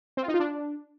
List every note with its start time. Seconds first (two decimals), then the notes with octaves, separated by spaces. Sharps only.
0.17 C4
0.23 F4
0.28 D#4
0.34 F4
0.40 D4